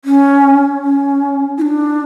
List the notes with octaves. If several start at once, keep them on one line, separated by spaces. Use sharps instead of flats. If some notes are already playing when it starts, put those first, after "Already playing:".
C#4
C#4
E4
D4